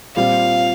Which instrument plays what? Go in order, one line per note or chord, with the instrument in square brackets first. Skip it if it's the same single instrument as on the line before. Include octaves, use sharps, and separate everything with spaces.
[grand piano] A#2 G3 C4 F4 [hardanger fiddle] F5